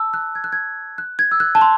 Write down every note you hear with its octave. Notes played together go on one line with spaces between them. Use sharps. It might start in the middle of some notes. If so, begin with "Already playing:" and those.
Already playing: A5 E6
F#6
G#6
F#6
G#6
F#6
G#6
E6
F#6
A5
C6